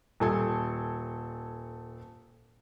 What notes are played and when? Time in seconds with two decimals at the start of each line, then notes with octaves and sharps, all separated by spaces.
0.20 D#1 A4 G#5